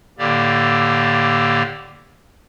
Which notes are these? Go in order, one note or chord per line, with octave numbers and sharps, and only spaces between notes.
A2 D3 A#3 G4 D5